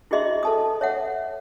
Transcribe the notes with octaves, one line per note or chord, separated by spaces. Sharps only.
E4 F#4 G#4 D#5 E5 C6
A4 A5 D#6
C#5 E5 F#5